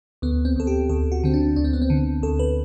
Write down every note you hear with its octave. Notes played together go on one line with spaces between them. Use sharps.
D2 B3
C4
D2 A4
G4
D2 A4
F#4
D3 C4
D4
D2 D4
C4
B3
C4
D3
D2 A4
B4